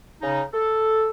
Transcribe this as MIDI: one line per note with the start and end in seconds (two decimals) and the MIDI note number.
0.21 0.41 49
0.21 0.41 63
0.53 1.10 69